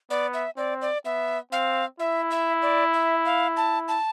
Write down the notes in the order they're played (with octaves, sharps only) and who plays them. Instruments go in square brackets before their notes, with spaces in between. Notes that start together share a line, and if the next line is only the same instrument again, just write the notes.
[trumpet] B3 [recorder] D5
[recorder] E5
[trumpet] C4 [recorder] D5
[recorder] D5
[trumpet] B3 [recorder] E5
[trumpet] C4 [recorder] F5
[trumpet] E4 [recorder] E5
[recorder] E5
D5
E5
F5
A5
A5